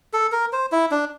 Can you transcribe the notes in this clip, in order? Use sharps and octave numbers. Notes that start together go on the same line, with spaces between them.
A4
A#4
C5
E4
D4